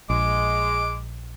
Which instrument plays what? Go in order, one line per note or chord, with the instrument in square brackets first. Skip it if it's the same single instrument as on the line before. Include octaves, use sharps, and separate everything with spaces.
[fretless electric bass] A#1 [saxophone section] G#3 [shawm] D6